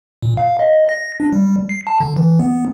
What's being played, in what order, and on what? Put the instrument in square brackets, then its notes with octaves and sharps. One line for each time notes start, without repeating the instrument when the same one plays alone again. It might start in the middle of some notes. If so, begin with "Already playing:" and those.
[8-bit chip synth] A#2
F5
D#5
A#6
D4
G3
C7
A5
D3
E3
B3